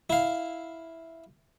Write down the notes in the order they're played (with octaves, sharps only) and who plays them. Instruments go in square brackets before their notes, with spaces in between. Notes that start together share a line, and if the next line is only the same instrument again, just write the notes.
[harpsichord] E4 F5